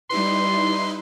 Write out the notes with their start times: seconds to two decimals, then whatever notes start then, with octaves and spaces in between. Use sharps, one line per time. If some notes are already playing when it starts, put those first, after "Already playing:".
0.10 G3 D#4 E4 B4 C6